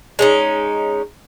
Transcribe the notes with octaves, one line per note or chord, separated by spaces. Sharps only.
G#3 C#4 D#4